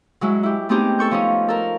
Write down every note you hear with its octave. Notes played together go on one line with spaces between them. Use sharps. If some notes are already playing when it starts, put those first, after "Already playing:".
F#3 G#3 E4
E4 G4
A3 B3 C4 D#4 G4 G#4
A4 C#6 G6
F3 C#4 D#4
A4 A#4